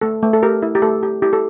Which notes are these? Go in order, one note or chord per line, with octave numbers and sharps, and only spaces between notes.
A3 A4
A3
A4
G4 A#4
E4
G4
A3 A4
G4
E4 G4
A4